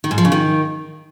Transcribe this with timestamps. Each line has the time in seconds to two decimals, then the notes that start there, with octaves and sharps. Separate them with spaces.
0.04 D#3
0.11 G#2
0.18 F3
0.25 C#3
0.32 D#3